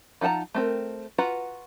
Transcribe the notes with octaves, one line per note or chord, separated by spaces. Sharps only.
F3 D#4 F#5 A5 A#5
A3 C4 A#4
F4 F#4 B4 F#5 A#5